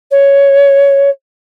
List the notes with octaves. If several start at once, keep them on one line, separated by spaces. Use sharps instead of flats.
C#5